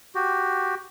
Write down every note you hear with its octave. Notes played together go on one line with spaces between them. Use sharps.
F#4 G4